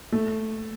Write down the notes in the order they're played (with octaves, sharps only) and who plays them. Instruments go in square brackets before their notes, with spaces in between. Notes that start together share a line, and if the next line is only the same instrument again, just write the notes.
[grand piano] A3